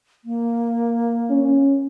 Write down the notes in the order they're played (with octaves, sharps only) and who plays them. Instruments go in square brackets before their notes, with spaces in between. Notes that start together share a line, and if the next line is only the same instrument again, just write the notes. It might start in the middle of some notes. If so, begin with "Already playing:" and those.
[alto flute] A#3
[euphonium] C#4